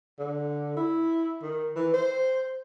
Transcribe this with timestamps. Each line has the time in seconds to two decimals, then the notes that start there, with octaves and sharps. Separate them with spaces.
0.19 D3
0.77 E4
1.42 D#3
1.76 E3
1.94 C5